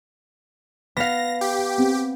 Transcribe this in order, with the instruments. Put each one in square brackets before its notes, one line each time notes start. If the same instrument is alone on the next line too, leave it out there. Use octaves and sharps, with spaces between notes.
[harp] B3 F5 [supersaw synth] A#6 [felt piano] B6
[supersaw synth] G4
[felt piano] C4